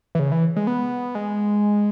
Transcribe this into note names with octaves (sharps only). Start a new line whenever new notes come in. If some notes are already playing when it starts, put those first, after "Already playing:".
E3
C#3
E3
G#3
B3
G#3